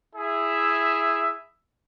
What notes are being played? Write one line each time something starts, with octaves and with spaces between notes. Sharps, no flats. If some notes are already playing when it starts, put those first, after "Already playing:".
E4 G#4 E5